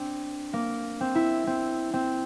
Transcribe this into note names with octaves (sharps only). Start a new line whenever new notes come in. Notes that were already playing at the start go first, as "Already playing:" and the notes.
Already playing: C4 D4
A#3
C4
E4
C4
C4